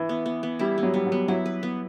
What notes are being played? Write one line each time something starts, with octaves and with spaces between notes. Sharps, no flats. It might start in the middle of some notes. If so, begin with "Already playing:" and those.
Already playing: E3
B3
B3
B3
G3 E4
B3
F#3
G3 B3
F#3
B3
F#3 E4
B4
B3